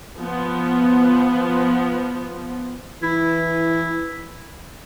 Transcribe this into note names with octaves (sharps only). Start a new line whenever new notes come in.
F3 B3
E3 E4